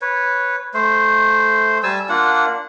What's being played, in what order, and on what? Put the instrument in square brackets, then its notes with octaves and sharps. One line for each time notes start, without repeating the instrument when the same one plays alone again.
[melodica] B4 C#5
A3 C5
G3 G#5 A5 E6
A#3 D4 F4 F#5